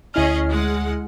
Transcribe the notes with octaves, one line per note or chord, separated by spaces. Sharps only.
D2 C#4 E4 G#4 D#5 F6
G#3 F#5